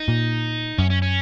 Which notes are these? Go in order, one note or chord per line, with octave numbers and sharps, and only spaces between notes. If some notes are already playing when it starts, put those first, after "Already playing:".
Already playing: D#4
A#2
F#2 C#4
C#4
C#4